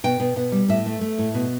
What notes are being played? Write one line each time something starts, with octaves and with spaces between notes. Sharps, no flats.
B2 G5
B2
B2 F#5
G3
A2 E5
A3
A3
A2
B2